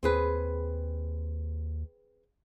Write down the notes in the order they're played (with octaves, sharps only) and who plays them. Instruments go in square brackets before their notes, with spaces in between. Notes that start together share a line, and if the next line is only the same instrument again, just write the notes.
[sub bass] D#2 [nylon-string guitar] C4 G#4 B4